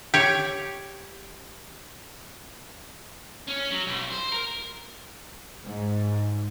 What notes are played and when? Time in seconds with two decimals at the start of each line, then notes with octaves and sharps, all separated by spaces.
0.14 G4 C#5
3.47 C#4
3.71 F#3
3.86 B1
4.11 C5
4.32 A#4
5.65 G#2